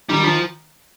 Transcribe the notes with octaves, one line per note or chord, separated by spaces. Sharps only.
D#3 G3
D#3 F3